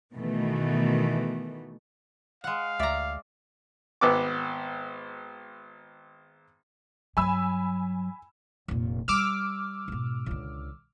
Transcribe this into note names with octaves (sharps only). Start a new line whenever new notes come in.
B2 D#3 E3 A3
G#3 F5 F#5
D2 D5 E5 A#5 D6
G#1 B3 D6
G2 F#3 G#5 B5 E6
F1 A#2
G3 D6 E6 F6
G#2 B2
C#2 D3